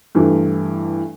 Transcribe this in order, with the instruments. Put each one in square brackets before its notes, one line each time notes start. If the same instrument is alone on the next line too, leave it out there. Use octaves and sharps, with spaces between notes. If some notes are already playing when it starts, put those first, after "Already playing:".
[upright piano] G2 E3 A3 E4